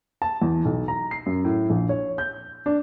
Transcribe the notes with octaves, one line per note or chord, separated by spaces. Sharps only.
A5
E2
B1
A#5
C7
F#2
A2
A#1
C#5
G6
D4